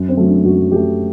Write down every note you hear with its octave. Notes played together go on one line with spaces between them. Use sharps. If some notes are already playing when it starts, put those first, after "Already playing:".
Already playing: F#2
C4
F#3 A3
D4
F#2 F#4
F#3 A3 G4